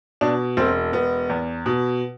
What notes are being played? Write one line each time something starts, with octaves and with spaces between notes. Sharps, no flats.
B2 D4
E1 C4
E1 B3
E2
B2